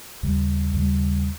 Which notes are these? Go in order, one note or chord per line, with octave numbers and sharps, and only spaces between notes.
D#2 C#3 G3
D#2 C#3 G3